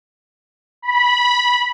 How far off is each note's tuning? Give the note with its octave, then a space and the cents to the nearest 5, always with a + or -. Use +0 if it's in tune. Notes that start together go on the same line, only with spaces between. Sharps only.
B5 -15